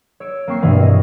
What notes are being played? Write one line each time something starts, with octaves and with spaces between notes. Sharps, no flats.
C#5 E6 D7
A#3 C4 C#6 C7
G2 B2 E3 A#3
D#5